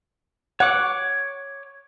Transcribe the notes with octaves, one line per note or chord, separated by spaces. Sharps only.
C#5 F#5 D6